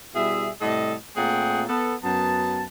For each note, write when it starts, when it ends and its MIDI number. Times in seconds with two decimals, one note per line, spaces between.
0.15 0.49 47
0.15 0.49 55
0.15 0.49 64
0.15 0.49 68
0.15 0.49 76
0.61 0.94 45
0.61 0.94 48
0.61 0.94 55
0.61 0.94 69
0.61 0.94 75
1.16 1.63 46
1.16 1.63 57
1.16 1.63 60
1.16 1.63 68
1.16 1.63 78
1.16 1.63 79
1.69 1.95 59
1.69 1.95 69
2.04 2.63 42
2.04 2.63 59
2.04 2.63 81